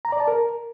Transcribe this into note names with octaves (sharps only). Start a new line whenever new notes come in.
A#5
D5
A5
A#4